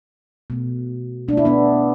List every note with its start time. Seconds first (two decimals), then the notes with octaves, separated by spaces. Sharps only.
0.50 B2 A3
1.28 B2 D4
1.33 A3 E4
1.45 B3 D4